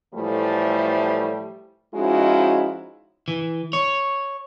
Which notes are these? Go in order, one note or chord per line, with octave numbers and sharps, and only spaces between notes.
A2 E3 F3 G3 A3
F3 G#3 C#4 D#4 E4 F#4
E3
C#5